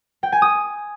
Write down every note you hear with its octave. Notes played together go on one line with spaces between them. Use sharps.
G5
G#5
D#6